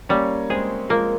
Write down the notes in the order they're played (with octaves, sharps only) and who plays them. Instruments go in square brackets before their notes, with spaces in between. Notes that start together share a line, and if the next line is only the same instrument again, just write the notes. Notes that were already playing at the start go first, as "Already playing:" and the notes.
[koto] G3 [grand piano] A#3 C#4
[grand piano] G#3 C4 [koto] G#4
[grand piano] F3 G#3 [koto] A#3